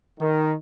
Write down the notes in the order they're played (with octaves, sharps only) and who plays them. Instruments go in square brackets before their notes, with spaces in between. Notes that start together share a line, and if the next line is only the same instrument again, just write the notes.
[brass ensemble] D#3